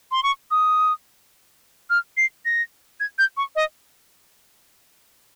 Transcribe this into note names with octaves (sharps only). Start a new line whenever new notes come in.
C6
C#6
D#6
F6
C7
A#6
G#6
G6
C#6
D#5